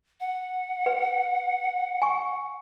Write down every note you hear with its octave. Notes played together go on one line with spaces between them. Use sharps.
F#5
B4
G#5 C#6